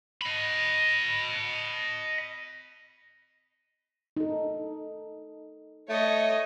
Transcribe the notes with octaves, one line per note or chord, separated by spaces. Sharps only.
D#5 B5
D#4 A4
A3 C#5 D#5